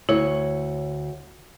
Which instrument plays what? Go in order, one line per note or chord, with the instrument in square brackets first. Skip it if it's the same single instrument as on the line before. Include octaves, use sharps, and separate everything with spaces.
[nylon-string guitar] D2 C#5 [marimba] E4